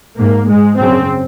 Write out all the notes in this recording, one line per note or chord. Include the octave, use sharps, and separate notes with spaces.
G#2 A#3
G#2 G#3
F#2 C#3 C4